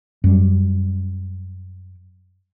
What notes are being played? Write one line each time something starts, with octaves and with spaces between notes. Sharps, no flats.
F#2 G3